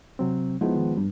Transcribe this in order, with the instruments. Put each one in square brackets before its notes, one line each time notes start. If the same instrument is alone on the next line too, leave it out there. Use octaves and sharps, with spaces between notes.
[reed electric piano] C3 F#3 C4
[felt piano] F3 G#3 B3 [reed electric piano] D#4 E4
[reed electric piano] D#3
[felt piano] G2 [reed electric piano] G3